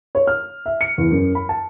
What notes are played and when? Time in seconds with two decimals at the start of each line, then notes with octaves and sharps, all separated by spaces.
0.15 C#5
0.27 F6
0.66 E5
0.81 C#7
0.98 E2
1.11 F#2
1.35 B5
1.49 A5